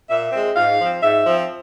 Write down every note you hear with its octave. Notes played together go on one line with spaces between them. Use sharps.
A#2 E5
G#3 C4
G#2 F5
F3 C4
G#2 E5
F3 C4